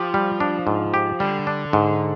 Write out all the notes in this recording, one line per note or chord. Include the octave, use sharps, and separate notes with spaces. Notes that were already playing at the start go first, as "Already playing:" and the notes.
Already playing: F3 G4
G3
D4
G#2
G4
D3 G3
D4
G#2